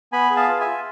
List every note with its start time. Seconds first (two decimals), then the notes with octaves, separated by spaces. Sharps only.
0.12 B3 G#5 B5
0.30 G#4
0.36 F5 A5
0.48 F4
0.61 E5 G#5
0.67 F4